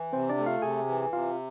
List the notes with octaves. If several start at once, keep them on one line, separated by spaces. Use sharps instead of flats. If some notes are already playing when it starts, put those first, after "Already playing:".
Already playing: E3
C3 C4 C5
D4 D5
A3
F4 F5
C3 G#4 G#5
E3
C3 F4 F5